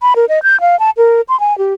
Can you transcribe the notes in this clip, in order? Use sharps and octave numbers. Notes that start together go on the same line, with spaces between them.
B5
A#4
D#5
G6
F5
A5
A#4
C6
G#5
G4